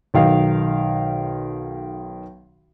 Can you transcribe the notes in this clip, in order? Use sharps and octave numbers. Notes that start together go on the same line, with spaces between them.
B1 D#3 F5